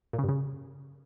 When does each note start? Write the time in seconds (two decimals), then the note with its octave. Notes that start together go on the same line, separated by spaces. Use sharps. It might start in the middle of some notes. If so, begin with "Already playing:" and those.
0.13 A#2
0.18 C#3
0.24 G2
0.29 C#3